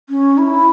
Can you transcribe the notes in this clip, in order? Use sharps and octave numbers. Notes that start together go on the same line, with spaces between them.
C#4
E4